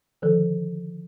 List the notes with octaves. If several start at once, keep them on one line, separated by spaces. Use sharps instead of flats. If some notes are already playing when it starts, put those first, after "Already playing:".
D3 D#3 F3 A4